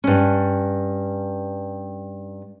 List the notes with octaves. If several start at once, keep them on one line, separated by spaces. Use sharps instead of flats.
G2 C#4